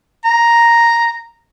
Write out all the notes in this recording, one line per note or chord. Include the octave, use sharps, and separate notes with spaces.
A#5